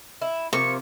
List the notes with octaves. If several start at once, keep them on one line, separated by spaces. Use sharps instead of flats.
E4
C3 F3 A#3 C#6